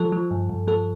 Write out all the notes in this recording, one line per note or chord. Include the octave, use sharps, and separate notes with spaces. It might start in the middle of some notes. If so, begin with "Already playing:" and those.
Already playing: F3 A4
F3
G2
G2
F3 A4